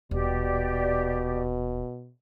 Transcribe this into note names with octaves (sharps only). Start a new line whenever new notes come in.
D#1 B2 G4 D5